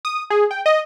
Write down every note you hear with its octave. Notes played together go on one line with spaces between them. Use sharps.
D#6
G#4
G5
D#5